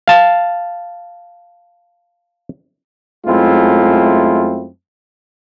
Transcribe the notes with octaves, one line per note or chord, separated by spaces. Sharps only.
F5 A5
F#2 G#3 A3 C4 E4 F4